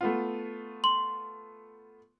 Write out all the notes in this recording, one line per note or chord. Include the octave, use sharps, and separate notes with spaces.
A3 B3 F4
C6 F#7